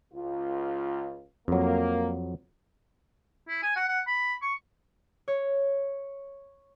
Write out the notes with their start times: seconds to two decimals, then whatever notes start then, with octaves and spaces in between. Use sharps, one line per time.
0.13 C#2 F4
1.48 F2 F#3 A#3
3.48 E4
3.63 G#5
3.76 F#5
3.88 F#5
4.07 B5
4.42 C#6
5.28 C#5